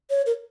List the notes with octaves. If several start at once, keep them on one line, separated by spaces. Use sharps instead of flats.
C#5
A#4